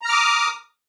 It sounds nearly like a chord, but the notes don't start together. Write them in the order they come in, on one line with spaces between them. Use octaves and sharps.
A#5 F6 D6 D#6